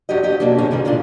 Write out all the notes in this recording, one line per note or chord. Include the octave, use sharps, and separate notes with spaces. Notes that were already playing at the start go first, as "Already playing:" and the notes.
F2 F#3 D4 G4 D#5
F#3 G4 D#5
F2 G#2 B2 F#3 A#3 D4
D2 A#2 D3 C#4 G#4
F#2 D3 D#3 G3
A2 D#3 F#3 G3 D4 F4